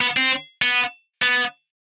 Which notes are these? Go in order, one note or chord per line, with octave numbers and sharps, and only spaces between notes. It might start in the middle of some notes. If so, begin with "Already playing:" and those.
B3
C4
B3
B3